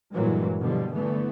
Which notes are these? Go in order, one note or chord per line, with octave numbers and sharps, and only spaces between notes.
G2 A#2 E3 F#3 G#3
B2 D3 F3 G3
G1 D3 E3 A3 B3